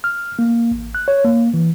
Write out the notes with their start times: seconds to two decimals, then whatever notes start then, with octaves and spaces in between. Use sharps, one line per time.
0.04 F6
0.39 A#3
0.71 A1
0.95 F#6
1.08 C#5
1.24 A#3
1.54 E3